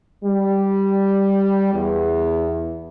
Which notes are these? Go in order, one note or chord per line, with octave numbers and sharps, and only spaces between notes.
G3
E2